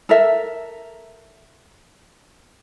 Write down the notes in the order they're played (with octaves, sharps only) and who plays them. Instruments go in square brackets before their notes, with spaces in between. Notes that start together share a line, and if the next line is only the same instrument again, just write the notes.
[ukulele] A4 A#4 E5